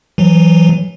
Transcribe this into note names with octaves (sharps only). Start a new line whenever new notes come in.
E3 F#3